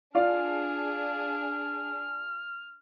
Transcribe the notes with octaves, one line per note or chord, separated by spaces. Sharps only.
D4 F4 G#4 D5 F5 F6